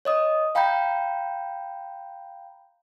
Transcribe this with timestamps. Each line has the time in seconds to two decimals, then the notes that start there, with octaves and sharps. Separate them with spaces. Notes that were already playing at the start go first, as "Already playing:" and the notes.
0.05 C#5 D#5 D#6
0.55 F5 G5 A#5 B5 G6